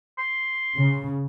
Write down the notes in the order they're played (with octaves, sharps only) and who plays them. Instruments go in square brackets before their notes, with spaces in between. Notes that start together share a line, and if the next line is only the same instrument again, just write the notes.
[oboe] C6
[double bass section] C#3